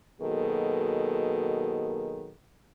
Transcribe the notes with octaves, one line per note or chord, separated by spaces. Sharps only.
B2 D#3 F#3 A#3 G#4 A4